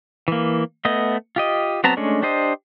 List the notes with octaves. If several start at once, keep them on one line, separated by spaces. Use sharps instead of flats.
E3 A#3
A3 B3 D#5
F4 G4 D#5
F#3 B3 C4 A5 A#5
G#3 A3 C#4 D4
D4 G4 C5 D#5